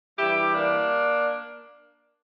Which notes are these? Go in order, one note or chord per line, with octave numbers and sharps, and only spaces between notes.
G2 E3 G3 E4 G4
A#3 D4